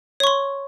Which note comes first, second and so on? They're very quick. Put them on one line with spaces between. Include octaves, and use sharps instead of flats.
C#5 C#6 C6